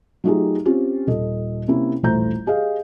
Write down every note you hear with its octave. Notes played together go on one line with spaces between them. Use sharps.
F#3 A3 D#4 F4 G4 G#4
C4 C#4 F4 G4
D#1 A4 D#5
C3 A#3 C#4 E4
D#1 A1 A3 C5 A#5 G6
G4 G#4 D#5 F5